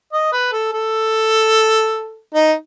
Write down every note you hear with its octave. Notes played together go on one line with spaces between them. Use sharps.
D#5
B4
A4
A4
D#4